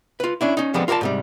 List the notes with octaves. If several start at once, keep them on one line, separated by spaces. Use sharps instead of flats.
F4 B4
C#4 D4 E4
C#4 D#4
D3 F3 G3 G#3 B3 C4
F4 A#4 D5 F#5 A5
G#2 C3 G3